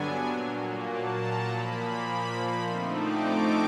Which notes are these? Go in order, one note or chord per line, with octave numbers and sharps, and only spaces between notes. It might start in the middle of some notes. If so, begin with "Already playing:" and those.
Already playing: G2 D3 F#3 B3 D4 G#5
A#2 F#3 A#3
A5
A#5
A#2 F3 A#3 B5
D3 F3 A3 C4 D#4 C6
D6
C#6